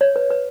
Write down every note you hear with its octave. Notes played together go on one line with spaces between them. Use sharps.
C#5
B4
B4